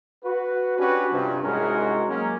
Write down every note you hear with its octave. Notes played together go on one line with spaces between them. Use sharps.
F#4 B4
C#4 D4 F#4 G4 B4
G2 C3 F3
C2 G#2 G#3 C#4 F#4 A#4
F#3 G#3 A#3 C#4 F#4 A#4